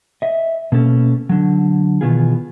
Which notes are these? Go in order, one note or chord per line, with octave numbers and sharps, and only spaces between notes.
D#5 E5
B2 A#3 C#4 A4
D3 F#3
B2 D#3 E3 B3 F4 G#4